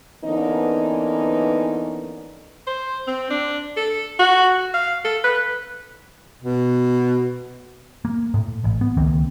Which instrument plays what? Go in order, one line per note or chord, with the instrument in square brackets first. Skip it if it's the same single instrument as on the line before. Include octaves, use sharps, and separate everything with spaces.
[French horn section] D3 E3 A#3 B3 C#4 D#4
[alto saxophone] C5
C4
D4
A4
F#4
F5
A4
B4
[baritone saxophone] B2
[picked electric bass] A#3
A2
A1
B3
C#2 D#3 A#3 C4